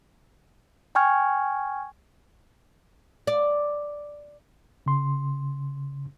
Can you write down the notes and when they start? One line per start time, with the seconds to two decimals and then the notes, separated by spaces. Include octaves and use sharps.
0.95 G5 G#5 C#6 F6 G#6
3.27 D5
4.86 C#3 C6